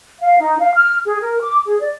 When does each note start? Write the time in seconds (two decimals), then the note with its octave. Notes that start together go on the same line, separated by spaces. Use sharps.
0.21 F5
0.41 D#4
0.60 F5
0.75 F6
1.06 G#4
1.21 A#4
1.42 D6
1.66 G#4
1.80 D5